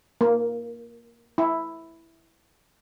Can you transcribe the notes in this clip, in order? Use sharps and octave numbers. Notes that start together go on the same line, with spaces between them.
A#3
E4